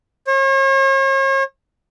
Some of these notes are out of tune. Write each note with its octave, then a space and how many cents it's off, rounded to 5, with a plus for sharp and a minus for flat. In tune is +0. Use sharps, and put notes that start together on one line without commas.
C#5 -40